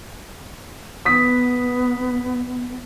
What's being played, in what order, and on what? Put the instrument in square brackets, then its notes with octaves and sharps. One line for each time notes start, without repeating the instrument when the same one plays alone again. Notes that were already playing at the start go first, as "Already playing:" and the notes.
[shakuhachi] B3 [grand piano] D#6 B6